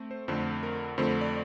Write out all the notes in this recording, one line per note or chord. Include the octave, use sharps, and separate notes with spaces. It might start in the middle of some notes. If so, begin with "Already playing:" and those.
Already playing: A3 C4
C5
F2 D3 A3 C4 C5
A#4
F2 D3 A3 C4 C5
D5